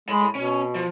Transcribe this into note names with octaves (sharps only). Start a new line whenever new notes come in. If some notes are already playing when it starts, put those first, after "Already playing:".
A2 G#3 B5
B2 C#4
F3